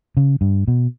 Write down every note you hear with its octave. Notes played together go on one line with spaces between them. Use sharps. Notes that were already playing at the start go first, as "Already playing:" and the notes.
C#3
G2
B2